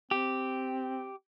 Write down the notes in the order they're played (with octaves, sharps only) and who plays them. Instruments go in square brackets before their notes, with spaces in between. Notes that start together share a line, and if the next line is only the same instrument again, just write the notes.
[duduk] C4 [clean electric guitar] G4